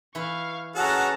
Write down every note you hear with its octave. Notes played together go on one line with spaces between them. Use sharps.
E3 B4 F5 C#6
C#4 F#4 G#4 A4 F#5 A5 A#5